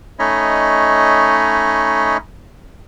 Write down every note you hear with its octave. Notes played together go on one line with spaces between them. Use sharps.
A3 C#4 D#4 C#5 D#5 B5